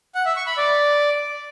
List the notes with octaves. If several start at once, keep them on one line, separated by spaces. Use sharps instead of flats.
F#5
E5
C#6
B5
D5